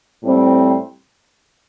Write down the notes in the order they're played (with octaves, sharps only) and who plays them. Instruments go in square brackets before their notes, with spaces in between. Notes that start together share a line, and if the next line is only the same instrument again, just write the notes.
[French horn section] A2 G3 C4